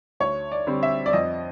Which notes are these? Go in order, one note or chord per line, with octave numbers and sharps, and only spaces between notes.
D2 C#5
D5
D3 G3 C4
E5
D5
F2 D#5